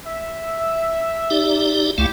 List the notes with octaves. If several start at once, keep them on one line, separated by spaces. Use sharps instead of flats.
E5
D#4 G4 D5
C#2 A3 E4 G4 F5